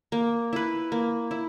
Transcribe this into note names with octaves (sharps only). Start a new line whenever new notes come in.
A#3
E4 B4
A#3
E4